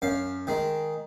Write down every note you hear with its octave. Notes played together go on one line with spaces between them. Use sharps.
F#2 F5
D#3 G#3